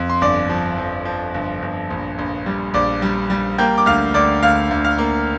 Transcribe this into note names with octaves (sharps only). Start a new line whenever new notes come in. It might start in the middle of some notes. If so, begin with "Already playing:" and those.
Already playing: F2
C6
G1 D5 D6
F3
F3
F3
G1
G1
A#1
A#1
G3
A#1 D5 D6
G3
G3
A#3 G5 G6
D6
D2 F5 F6
D2 D5 D6
D2 F5 F6
D2
F5 F6
A#3